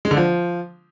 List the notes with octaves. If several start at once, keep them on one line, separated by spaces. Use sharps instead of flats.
G#3
D3
F3